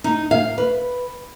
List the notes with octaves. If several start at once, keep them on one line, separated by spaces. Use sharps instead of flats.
D#4
F5
B4